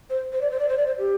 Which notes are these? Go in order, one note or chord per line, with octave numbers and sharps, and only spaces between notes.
C5
C5
D5
C5
D5
C5
D5
C5
G4